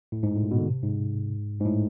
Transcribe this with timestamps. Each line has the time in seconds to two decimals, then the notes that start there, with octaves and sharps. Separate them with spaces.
0.12 A2
0.23 G#2
0.35 A2
0.43 A#2
0.51 B2
0.58 D3
0.68 C3
0.83 G#2
1.60 G#2
1.65 A2